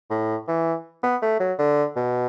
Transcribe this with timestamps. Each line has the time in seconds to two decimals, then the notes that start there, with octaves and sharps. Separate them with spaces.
0.10 A2
0.48 E3
1.03 B3
1.22 A3
1.40 F#3
1.59 D3
1.96 B2